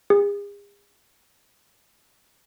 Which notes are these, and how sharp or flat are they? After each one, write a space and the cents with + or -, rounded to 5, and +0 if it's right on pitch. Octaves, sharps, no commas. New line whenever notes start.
G#4 -40